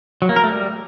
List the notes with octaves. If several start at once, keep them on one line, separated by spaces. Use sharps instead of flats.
F#3
A#3
A#4
A3
G3